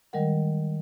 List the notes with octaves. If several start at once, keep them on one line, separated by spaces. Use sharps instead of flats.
D#3 G3 G#3 A#4 F#5